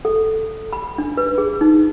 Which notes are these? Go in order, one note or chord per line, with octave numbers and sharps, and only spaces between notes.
A4
B5
D4
B4
G#4
D#4